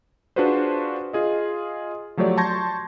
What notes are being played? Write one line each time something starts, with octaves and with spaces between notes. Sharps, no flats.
D4 F4 F#4 G#4 B4 C5
F4 G#4 D#5
F3 F#3 A3 G4 C#5 D5
A5 C6 C#6 G6 G#6 A#6